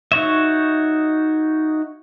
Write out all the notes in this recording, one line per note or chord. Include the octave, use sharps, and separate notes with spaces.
D#4 F#4 C#5 E5